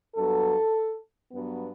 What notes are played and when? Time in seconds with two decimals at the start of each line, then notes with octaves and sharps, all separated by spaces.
0.16 G2 F#3 B3 A4
1.32 G2 F#3 B3